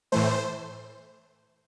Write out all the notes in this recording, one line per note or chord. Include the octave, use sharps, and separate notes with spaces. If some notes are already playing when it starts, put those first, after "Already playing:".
A2 E3 A3 C5